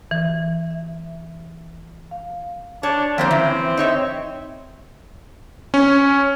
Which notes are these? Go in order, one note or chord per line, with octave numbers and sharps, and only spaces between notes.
E3
E5
F5
D4 C#5
F3 A#3 C4 C5
E3 C#4
D#4 C#5 E5
C#4